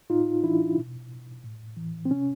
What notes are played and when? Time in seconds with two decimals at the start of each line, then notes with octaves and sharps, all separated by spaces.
0.10 A2 D#4 F4
0.43 E3 D4 E4
0.76 B2
1.43 A2
1.77 E3
2.05 C4
2.10 C3 C#4